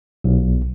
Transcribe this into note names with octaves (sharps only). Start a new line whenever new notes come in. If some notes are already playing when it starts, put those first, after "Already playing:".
B1